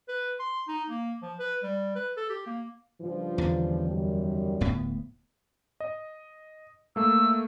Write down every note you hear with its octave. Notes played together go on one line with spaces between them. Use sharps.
B4
C6
D#4
A#3
F3
B4
G3
B4
A4
G4
A#3
G2 C#3 F3
E2 D3
F#2 D#3 G3
D1 A2 B3
D#5
A3 A#3 E6